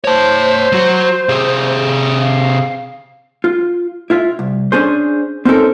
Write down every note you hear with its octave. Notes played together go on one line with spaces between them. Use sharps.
C5 C#5 A5
F#3 F#4
C3 G#4
F5
F4
E4 F4 E5
C2
C#4 D4 G#4 C5
C4 C#4 D#4 F#4 A4 A#4